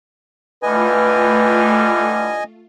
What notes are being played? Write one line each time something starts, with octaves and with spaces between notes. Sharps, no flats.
D3 E3 G3 A3 F4 B4 D#5 G#5